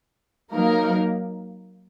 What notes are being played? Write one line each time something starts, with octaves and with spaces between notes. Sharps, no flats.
F#3 A#3 D#4 A#4